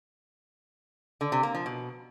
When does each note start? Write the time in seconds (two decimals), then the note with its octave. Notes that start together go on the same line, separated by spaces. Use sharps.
1.21 D3
1.32 C3
1.43 A#3
1.55 F3
1.66 B2